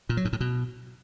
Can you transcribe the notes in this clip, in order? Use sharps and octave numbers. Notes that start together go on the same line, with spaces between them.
A#2
F#3
G#2
A2
B2